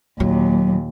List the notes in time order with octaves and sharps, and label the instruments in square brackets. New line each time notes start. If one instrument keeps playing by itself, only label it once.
[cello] D#2 A#2 [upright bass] F#3